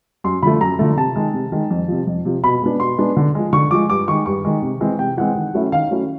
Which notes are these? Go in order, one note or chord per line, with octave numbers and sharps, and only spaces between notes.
F#2 C6
D3 F3 A3 B5
F#2 A#5
D3 F3 A3
C3 A5
D#3 G#3
C3
D#3 G#3
F2
C3 F3
F2
C3 F3
B2 B5
G#3 B3 D4
B2 C6
G#3 B3 D4
D3
F3 G#3
D3 C#6
F3 G#3 D6
G2 D6
D#3 G#3 C#6
G2 C#6
D#3 G#3
C3
E3 G#3 C4
C3 G5
E3 G#3 C4 F#5
D#3
F#3 A3 C#4 E4
D#3 F5
F#3 A3 C#4 E4